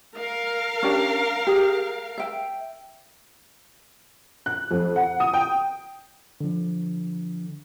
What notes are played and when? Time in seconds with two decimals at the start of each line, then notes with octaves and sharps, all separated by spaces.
0.16 A#4 F5
0.83 C#4 D4 G4
1.47 G4 G#4
2.18 E5 G5
4.46 F#6
4.71 F2
4.96 F#5
5.20 D#6
5.34 G5
6.41 D3 F3